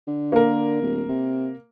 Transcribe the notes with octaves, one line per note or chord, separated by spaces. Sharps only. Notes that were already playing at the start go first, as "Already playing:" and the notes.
D3
A#3 A#4
D1
C3